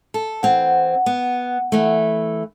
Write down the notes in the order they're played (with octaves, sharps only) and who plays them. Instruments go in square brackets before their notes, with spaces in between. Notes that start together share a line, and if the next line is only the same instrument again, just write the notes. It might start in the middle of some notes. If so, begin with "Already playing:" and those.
[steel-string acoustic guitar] A4
[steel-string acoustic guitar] E3 C4 [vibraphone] F#5
[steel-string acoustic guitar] B3
E3 A3